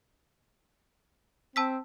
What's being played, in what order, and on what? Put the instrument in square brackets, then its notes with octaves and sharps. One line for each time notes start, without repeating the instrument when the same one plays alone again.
[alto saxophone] C4 [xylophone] A5 E6 B6